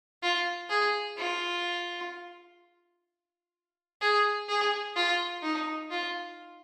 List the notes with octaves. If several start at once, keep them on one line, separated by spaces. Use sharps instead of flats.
F4
G#4
F4
G#4
G#4
F4
D#4
F4